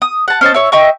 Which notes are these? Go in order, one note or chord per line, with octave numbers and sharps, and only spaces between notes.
D#6
F#5 A5
C#4 C5 D#5 A5
E4 C#5 E6
D#5 E5 G5 C#6